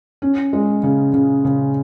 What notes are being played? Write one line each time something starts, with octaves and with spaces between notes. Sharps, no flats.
C#4
G#3
C#3
C#3
C#3